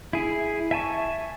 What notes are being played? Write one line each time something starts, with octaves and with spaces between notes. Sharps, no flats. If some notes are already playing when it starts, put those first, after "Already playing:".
E4 G#4
E5 G#5 A5 C#6